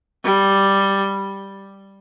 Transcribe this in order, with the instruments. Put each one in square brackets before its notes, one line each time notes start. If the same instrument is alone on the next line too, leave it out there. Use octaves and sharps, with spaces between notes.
[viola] G3